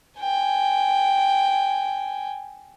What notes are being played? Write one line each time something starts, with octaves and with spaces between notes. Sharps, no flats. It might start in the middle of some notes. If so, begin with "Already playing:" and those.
G5 G#5